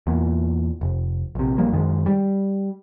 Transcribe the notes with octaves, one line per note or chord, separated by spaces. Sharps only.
E2 A#2
F1
A#1 C3
A1 F3 G3 A#3
F#2 D#3 G#3
G3